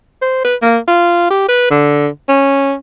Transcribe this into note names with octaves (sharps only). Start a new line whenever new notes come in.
C5
B4
A#3
F4
G4
B4
D3
C#4